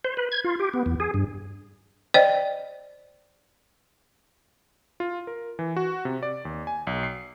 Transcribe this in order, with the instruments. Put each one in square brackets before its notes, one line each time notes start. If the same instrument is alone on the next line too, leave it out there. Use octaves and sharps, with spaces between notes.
[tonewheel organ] C5
B4
G#6
F4
G4
B3
E2
G#4
G2
[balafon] C5 D5 D#5 G5
[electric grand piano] F4
A#4
E3
F#4
C3
D5
D#2
G#5
B1
C7